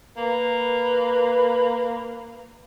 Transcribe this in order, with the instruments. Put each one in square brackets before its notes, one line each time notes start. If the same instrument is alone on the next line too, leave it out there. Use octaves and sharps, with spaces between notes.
[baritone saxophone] A#3 [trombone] B4